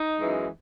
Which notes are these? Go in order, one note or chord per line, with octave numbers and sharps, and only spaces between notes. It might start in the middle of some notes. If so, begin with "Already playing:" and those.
Already playing: D#4
F#2 E3 G#3